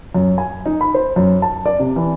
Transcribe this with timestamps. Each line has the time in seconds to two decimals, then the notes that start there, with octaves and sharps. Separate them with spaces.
0.14 F#2
0.38 G#5
0.66 D#4
0.81 B5
0.94 C5
1.16 F#2
1.42 A5
1.66 D5
1.79 C3
1.96 E3